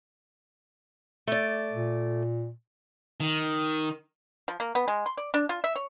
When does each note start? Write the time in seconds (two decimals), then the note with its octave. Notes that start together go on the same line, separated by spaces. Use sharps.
1.27 A3 D5
1.72 A#2
3.20 D#3
4.48 F3
4.60 A#3
4.75 B3
4.88 G#3
5.06 C6
5.17 D5
5.34 D4
5.49 F4
5.64 E5
5.75 C#5